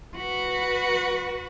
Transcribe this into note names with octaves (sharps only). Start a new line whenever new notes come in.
F#4 B4